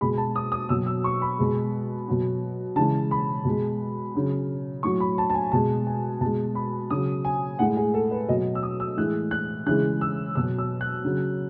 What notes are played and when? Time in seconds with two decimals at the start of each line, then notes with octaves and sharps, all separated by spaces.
0.01 B2 G#3 B5
0.18 A5
0.36 D#6
0.52 D#6
0.69 B2 F#3 E6
0.86 E6
1.04 C#6
1.22 B5
1.39 B2 G#3
2.08 B2 F#3
2.76 C#3 E3 G#3 A5
3.11 B5
3.45 B2 G#3
4.14 C#3 F#3
4.83 A2 F#3 C#6
5.00 B5
5.18 A5
5.30 A5
5.34 G#5
5.52 B2 G#3 A5
5.87 G#5
6.21 B2 G#3 A5
6.55 B5
6.90 C#3 F#3 D#6
7.25 G#5
7.59 A2 G#3 F#5
7.77 G#4
7.94 A4
8.11 B4
8.28 B2 F#3 D#5
8.55 E6
8.63 D#6
8.80 E6
8.97 A2 E3 G#3 F#6
9.31 F#6
9.66 C#3 E3 G#3 F#6
10.01 E6
10.35 B2 F#3 E6
10.58 E6
10.81 F#6
11.05 C#3 F#3